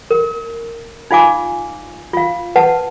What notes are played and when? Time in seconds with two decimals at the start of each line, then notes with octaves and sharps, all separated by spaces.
0.11 A#4
1.11 D#4 F4 F5 G#5 D6
2.13 F4 F5
2.56 B4 F#5 A5